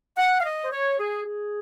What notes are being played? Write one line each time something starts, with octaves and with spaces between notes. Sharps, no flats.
F#5
F5
D#5
C5
C#5
G#4
G#4